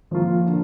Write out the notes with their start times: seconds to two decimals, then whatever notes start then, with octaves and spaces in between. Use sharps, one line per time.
0.11 F3 A#3 F4
0.47 D3